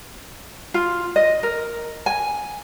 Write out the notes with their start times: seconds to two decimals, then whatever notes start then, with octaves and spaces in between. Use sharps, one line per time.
0.74 F4
1.16 D#5
1.43 A#4
2.06 G#5